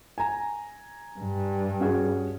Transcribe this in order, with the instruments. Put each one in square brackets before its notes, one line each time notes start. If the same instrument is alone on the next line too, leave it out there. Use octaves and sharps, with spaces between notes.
[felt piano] G#5 A#5
[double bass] G2
[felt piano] C#4 F#4 G#4